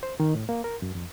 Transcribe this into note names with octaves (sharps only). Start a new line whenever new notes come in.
C5
D#3
A2
A#3
A#4
F#2
F2